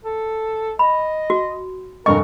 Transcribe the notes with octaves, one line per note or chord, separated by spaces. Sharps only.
A4
D#5 B5
F#4
F1 G2 A#4 D#5 C#6